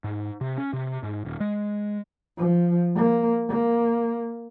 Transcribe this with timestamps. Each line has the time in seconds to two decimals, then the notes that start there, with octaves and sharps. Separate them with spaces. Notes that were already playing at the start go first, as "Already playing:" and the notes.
0.04 G#2
0.41 C3
0.58 C#4
0.73 C3
1.03 G#2
1.25 D#1
1.40 G#3
2.38 F3
2.95 A#3
3.48 A#3